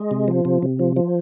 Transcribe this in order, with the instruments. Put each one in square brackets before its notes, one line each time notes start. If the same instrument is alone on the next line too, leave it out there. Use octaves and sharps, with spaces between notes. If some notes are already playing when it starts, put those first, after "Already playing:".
Already playing: [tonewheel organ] G#3
C3
F3
C3
C3
F3
F3